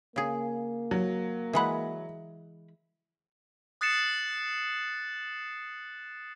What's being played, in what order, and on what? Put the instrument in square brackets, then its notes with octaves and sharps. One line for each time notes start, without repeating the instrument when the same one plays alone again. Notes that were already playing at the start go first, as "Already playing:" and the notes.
[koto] C#3 G#4 [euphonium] A#3
[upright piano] F#3
[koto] E3 G#3 F#5 [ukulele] E5 B5
[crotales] D#6 F#6 A6 C7 C#7 E7